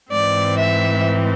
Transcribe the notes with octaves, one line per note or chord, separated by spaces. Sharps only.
G#2 E3 G#3 C4 D5
E5